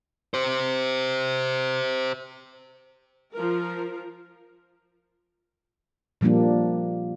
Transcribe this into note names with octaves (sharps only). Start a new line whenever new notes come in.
G4 C5
F3 A#4
A#2 F3 G3 A#3 D4